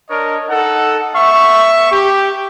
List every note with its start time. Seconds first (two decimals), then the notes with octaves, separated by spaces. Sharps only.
0.10 D4 A#4 C#5 D#5
0.50 D#4 A4 F#5
1.15 B3 E5 C#6
1.92 G4